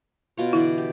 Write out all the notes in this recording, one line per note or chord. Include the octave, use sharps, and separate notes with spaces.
B2 F4 C#5
D3 E3 E4 D5
G4